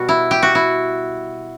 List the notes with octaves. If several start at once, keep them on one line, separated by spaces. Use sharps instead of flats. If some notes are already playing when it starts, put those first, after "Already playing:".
Already playing: B2 G3 F#4
E4
G4
F#4
E4